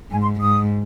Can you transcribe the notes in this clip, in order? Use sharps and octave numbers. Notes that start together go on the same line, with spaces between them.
G#2 G#5
C6
G#2 D#6